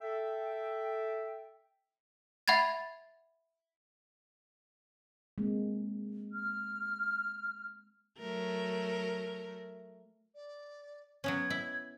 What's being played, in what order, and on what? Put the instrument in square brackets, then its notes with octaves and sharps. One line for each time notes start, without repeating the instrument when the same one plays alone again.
[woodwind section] A4 E5 G5
[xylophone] E5 F#5 B5 G#6 A6
[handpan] G#3 A#3 C4
[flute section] F6
[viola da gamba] F#3 A3 A#4
[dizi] D5
[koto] F#3 B3 C#4 [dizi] G#6
[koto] E4